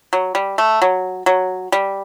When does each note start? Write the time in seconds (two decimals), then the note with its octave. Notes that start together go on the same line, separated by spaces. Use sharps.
0.13 F#3
0.35 G3
0.58 A3
0.82 F#3
1.26 F#3
1.72 G3